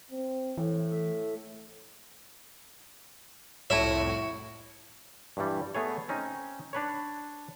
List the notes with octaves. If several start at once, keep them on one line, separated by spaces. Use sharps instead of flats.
C4
A2 E3
A3 E5
C2 F2 A2 E4 F#4 C#5 E5 A5
G2 E3 G3
A3 B3 G#4 C#5
C4 C#4 D#4
D4 B4 C#5